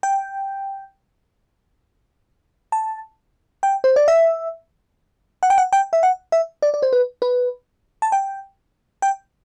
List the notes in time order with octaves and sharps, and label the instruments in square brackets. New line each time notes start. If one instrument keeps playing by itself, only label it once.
[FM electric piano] G5
A5
G5
C5
D5
E5
F#5
G5
F#5
G5
E5
F#5
E5
D5
D5
C5
B4
B4
A5
G5
G5